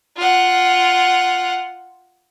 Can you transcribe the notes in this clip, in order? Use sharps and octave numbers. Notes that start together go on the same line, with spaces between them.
F4 F#5